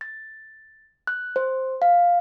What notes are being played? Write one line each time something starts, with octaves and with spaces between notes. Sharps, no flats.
A6
F#6
C5
F5